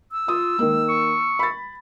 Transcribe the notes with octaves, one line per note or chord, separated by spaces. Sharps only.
E6
F4 D#6
D#3 G#3 A#3
C#6
B5 A6